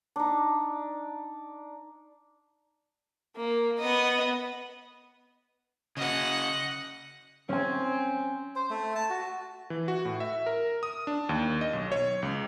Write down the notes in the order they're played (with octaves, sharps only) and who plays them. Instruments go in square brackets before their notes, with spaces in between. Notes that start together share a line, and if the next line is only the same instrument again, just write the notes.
[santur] D4 D#4
[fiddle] A#3
B3 D#5
[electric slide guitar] C#3 F#4 [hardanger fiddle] D#5 F#5
[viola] C4 [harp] C#4 G#5
[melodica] C5
A3
A5
F#4
[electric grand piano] E3
F#4
A2
E5
A#4
D#6
D4
D#2
D#5
B1
C#5
C#2